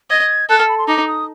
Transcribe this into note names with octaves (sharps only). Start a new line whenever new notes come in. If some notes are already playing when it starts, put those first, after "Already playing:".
D#5 G#6
A4 F#6
F6
B5
C6
D#4 D6
D#6